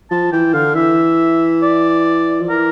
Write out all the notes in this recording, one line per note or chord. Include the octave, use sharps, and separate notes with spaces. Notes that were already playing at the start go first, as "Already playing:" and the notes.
F3 A5
E3 G5
D3 F5
E3 E5
D5
F3
E3 A#4